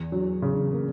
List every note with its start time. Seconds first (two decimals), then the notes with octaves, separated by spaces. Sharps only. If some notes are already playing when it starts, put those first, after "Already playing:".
Already playing: E2
0.12 F#3
0.42 C#3
0.72 A#3